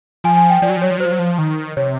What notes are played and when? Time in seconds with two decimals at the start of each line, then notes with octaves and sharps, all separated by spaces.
0.24 F3 G#5
0.37 G#5
0.50 G5
0.62 F3 D5
0.69 F#3
0.77 F3
0.82 F#3 C#5
0.91 F3
0.97 F#3
1.00 C5
1.06 F3
1.12 F#3
1.19 F3
1.38 D#3
1.77 C3 C#5